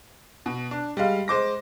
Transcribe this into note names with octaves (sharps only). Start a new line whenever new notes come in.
B2
D4
G3 G#3 F5
G#3 C5 D6 A#6